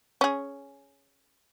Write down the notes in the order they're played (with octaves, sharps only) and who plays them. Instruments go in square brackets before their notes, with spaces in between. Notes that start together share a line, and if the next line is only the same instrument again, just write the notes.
[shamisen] C#4 G#4